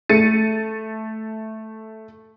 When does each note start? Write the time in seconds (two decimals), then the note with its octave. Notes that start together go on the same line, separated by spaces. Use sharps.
0.09 A3 A6 C#7 D#7